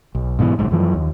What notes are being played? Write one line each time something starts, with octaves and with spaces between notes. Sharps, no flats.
B1
G#2 B2 D#3 E3
F#1 B1 G#2
F#2 E3 F3
D#2